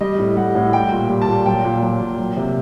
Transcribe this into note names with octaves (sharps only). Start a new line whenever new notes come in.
G3 D#5
A2
G3 F#5
A2
G3 G5
A#2
G3
A5
A#2
F#3 G5
A#2
F#3
A#2
F#3
C3